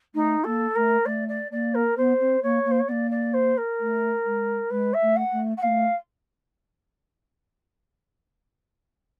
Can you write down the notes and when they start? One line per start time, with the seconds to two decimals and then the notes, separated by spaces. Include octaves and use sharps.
0.14 A3 D#4
0.44 A#3 A4
0.75 A3 A#4
1.05 A3 D5
1.28 D5
1.51 A#3 D5
1.75 A#4
1.97 B3 C5
2.20 C4
2.43 A#3 C#5
2.65 A#3
2.71 C5
2.79 C#5
2.88 A#3 B3 D5
3.11 D5
3.34 C5
3.57 A#4
3.79 A3
4.25 G#3
4.70 G#3 B4
4.94 E5
5.02 A3
5.16 F#5
5.32 A3
5.57 F#5
5.62 A#3 F5
5.67 A3